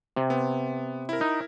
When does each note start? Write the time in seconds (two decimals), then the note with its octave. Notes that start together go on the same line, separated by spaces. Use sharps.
0.16 C3
0.30 B3
1.09 E4 A#4
1.21 D#4